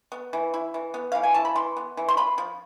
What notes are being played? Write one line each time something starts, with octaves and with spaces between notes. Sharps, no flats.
B3
E3
E4
E3
B3
E3 F5
G#5
E4 A5
B5
E3 C6
B3
E3
C6
F4 B5
F3